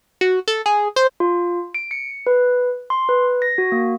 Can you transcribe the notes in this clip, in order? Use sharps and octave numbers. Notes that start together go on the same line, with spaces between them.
F#4
A4
G#4
C5
F4
D7
C#7
B4
C6
B4
A#6
F#4
A#3